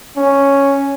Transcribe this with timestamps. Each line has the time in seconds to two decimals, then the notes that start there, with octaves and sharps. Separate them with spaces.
0.17 C#4